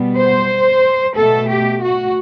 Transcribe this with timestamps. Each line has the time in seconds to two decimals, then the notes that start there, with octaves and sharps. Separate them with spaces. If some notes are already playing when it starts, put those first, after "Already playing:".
Already playing: B2 G3 B3
0.18 C5
1.16 B2 A3 A4
1.49 G4
1.82 F#4